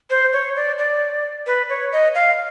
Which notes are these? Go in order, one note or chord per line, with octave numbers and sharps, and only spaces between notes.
C5
C#5
D5
D5
B4
C#5
D#5
F5